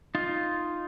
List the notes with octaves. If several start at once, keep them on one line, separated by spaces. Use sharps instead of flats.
D#4 F4